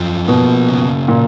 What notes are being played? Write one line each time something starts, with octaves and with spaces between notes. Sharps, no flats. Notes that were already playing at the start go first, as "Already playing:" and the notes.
Already playing: F#2 F3
B2 A#3
C#3
A#2